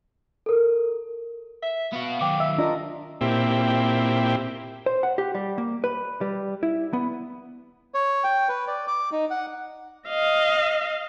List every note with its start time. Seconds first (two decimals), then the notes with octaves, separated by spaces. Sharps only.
0.46 A4 A#4
1.63 E5
1.93 B3 F#4 F5
2.21 D#3 F#3 G5 D6
2.40 E5 E6
2.58 D4 F4 A#4 D#5
3.21 A#2 C4 E4 G4
4.86 C5
5.03 F#5
5.18 G4
5.35 G3
5.58 A#3
5.84 B4
6.21 G3
6.63 E4
6.93 B3
7.94 C#5
8.24 G5
8.49 B4
8.67 D5
8.88 D6
9.12 D#4
9.31 F#5
10.08 D#5 F5